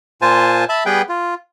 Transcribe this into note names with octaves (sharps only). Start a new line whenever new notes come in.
A#2 F4 C5 G#5 A5
E5 A5 B5
G3 B3 G#4 B4 G5
F4